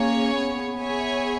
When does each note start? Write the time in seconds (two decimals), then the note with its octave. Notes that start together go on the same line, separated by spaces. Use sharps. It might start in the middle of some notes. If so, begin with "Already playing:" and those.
Already playing: A#3 C#4 G#4 C#5
0.34 B3
0.80 G#4 C#5 E5 G#5